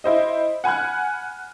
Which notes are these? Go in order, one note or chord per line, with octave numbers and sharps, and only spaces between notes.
E4 C5 D#5
F#5 G#5 B5 F6 F#6